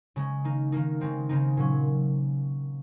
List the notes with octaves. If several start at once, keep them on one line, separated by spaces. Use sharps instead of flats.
C#3 G#3 C#4
D#3 A#3 D#4
D#3 A#3 D#4
C#3 G#3 C4 D#4
C#3 G#3 C4 D#4
A#2 F#3 C#4